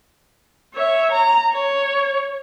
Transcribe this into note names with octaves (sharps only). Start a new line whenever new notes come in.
C#5 E5
A#5
C#5